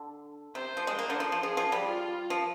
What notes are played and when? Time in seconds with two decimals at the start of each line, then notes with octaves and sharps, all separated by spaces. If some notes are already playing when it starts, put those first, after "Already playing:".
Already playing: D3
0.55 C3 C5
0.77 F3
0.87 G#3
0.99 A#3 C5
1.10 D3
1.20 F3
1.32 F3
1.43 F3 G#4
1.57 F3
1.72 G3
1.87 F4
2.30 F3